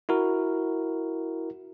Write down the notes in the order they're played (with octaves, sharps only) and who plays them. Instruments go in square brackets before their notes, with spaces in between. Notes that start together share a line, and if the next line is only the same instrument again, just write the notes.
[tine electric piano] E4 F#4 A#4